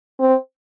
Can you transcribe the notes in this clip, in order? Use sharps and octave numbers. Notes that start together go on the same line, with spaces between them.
C4